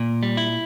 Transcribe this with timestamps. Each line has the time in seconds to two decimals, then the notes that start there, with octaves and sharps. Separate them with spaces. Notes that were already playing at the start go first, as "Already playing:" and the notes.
Already playing: A#2
0.23 G3
0.37 E4